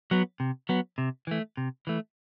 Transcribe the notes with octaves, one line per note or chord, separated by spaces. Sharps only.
F#3 B3
C3
F#3 B3
C3
E3 A3
C3
E3 A3